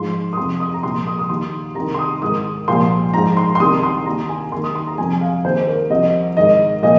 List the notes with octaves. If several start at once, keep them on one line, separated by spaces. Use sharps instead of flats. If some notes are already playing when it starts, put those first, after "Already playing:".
Already playing: G#2 F3 C6
D#6
F2 C3 F3 C6
D#6
A#5
C2 A#2 F3 C6
D#6
D#6
D#2 D#3 C6
C2 C3 D#3 A#5
C6
D#6
G#2 D#3 D#6
C2 A#2 F3 C6
G#2 F3 A#5
C6
C6
C2 C3 D#3 D#6
C6
D#2 D#3 A#5
G#5
D#2 D#3 C6
D#6
C6
A#5
F2 C3 F3 G#5
G#5
F5
D#2 D#3 C5
C5
A#4
C2 C3 F3 D#5
G#2 D#3 D#5
A#2 F3 D#5